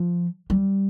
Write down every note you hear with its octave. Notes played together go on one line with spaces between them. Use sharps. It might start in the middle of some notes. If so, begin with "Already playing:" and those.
Already playing: F3
G3